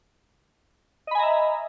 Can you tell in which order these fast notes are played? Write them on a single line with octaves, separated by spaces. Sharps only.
D#5 B5 G#5 A#5 E5